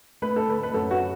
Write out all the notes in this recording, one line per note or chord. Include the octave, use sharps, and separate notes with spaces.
A3 B4
A4
D2 B4
B4
F#2 A4
F#4